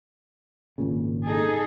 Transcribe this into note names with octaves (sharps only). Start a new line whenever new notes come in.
G#1 A#2 C#3
D#4 G#4 A4